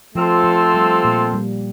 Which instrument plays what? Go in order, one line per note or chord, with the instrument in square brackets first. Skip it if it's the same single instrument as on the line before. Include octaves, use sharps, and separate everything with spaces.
[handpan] F3 [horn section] A3 C4 F4 A4 C5
[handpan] F3
G3
A#2 A#3
G3